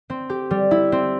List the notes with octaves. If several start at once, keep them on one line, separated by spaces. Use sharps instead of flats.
C4
G4
G3
E4
C4